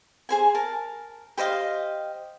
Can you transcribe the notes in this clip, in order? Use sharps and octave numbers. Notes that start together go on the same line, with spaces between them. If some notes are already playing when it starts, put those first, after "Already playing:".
G#4 C5 G#5
A#4 A5
G4 C5 D#5 F5